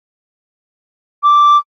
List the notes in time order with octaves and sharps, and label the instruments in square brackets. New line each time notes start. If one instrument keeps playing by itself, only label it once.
[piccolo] D6